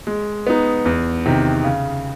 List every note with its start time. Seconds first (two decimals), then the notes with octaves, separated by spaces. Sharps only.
0.07 G#3
0.47 B3 D#4
0.85 E2
1.26 C3 D#3
1.64 C#3